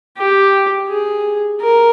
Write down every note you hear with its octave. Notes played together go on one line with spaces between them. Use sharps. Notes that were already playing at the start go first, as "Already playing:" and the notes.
G4
G#4
A#4